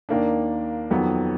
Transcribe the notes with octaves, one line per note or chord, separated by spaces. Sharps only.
D#2 D#3 A#3 D4
F2 D#3 F#3 B3